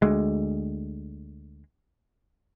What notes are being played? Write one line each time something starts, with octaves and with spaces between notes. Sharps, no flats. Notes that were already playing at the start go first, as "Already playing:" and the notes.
D2 G#3